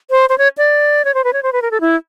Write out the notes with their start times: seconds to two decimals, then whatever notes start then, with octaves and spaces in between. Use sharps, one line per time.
0.11 C5
0.29 C5
0.38 C#5
0.58 D5
1.05 C#5
1.14 C5
1.24 B4
1.33 C#5
1.43 C5
1.53 B4
1.62 A#4
1.71 A4
1.81 E4